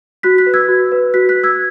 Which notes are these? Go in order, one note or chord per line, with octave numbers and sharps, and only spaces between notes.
F#4 F#6 B6
F#6 B6
B4
E6 G#6
F#4
B4
F#4 F#6 B6
F#6 B6
B4
E6 G#6